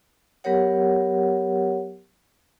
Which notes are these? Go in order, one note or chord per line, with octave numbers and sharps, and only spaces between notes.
F#3 B3 G4 A#4 C#5 F#5